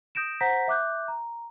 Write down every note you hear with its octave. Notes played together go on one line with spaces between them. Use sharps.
D#6 G6 A#6 D7 E7
C5 F#5 A#5 G6 A#6 B6
E5 D6 F#6 G6
A#5